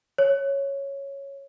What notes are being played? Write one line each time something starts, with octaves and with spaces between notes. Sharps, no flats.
C#5